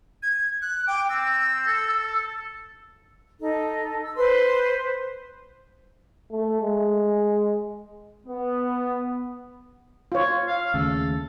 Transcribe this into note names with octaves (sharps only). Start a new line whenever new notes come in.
G#6
F#6
G5 D6
C4 E6
A4
D#4 A4
E6
B4 C5 C6
A3
G#3
B3
F4 C#5
F5
D#2 C#3 A3 A4